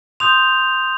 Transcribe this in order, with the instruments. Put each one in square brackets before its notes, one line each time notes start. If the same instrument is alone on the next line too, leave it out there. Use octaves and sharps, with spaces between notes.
[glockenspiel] C6 D#6 G6 F7